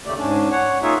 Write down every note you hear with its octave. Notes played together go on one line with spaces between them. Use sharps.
D#2 C#3 A3 G4 D5
G#2 C#4 D4
C#5 F#5
A#3 D#4 F4 G#4 C#5 E5